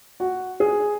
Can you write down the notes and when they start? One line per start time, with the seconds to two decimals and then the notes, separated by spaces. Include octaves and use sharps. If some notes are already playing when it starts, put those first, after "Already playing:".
0.20 F#4
0.60 G#4